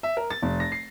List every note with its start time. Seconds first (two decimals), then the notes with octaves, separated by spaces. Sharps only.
0.03 E5
0.17 A#4
0.30 A6
0.42 F1
0.60 A#6
0.72 C7